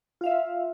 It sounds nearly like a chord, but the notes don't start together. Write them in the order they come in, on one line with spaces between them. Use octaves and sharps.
F4 F5 E5